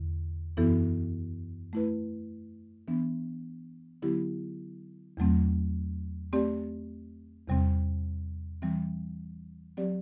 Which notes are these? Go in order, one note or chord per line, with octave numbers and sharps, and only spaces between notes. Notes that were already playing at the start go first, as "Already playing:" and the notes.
Already playing: E2 D3
F#2 E3 B3 E4 A4
A3 E4 B4
E3 B3 D4
D3 F#3 B3 E4 G4
E2 C3 F#3 A3 C4
A3 C4 G4 D5
E2 C3 G3 C4
E3 G3 C4
F#3 C4 G4 D5